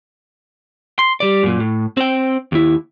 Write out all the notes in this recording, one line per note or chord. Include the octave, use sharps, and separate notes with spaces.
C6
G3 D5
F#2 A#2
A2
C4 G5
D#2 E4